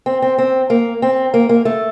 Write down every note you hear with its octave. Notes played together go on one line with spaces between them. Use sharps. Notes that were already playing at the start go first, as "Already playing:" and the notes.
C4
C4
C4
A#3
C4
A#3
A#3
A3